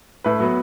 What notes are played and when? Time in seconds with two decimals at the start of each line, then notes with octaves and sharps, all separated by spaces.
0.24 A2 B4
0.40 F#3 B3